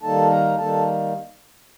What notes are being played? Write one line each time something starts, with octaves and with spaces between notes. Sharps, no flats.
D#3 G3 A#3 D#4 A4 A5
A#4 A#5
D#3 G3 A#3 D#4 A4 A5